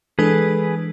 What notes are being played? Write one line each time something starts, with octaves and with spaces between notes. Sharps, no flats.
E3 G#3 D4 G#4 A4 B4